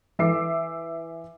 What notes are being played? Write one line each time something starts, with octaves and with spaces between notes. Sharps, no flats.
E3 E5 D6 E6 C7